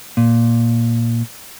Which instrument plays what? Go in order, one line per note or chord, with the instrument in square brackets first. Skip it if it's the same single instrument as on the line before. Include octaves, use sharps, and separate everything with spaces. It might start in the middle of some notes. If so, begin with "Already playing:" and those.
[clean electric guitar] A#2